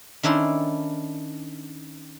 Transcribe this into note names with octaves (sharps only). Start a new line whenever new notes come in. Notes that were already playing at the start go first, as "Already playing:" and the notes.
D#3 C#4 D4 E4 A4 C6